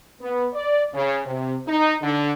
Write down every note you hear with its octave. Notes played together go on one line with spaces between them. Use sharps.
B3
D5
C#3
C3
D#4
D3